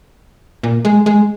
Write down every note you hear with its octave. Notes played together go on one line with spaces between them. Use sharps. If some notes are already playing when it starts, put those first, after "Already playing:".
A#2
G#3
G#3